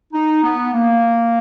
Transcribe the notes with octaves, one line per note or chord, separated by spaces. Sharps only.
D#4
B3
A#3